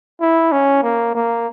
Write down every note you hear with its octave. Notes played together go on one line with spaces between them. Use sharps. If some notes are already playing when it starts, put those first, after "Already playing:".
E4
C#4
A#3
A#3